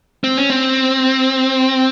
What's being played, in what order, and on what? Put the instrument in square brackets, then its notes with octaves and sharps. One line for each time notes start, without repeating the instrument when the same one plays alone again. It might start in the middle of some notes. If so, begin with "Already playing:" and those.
[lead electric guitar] C4
C#4
C4